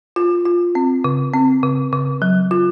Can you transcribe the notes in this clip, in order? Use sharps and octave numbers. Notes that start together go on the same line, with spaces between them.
F4
F4
C4
C#3
C4
C#3
C#3
F#3
F4